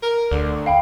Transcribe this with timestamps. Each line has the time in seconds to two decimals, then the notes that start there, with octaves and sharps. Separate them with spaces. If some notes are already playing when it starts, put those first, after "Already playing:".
0.03 A#4
0.31 D2 D3
0.66 F5 G5 B5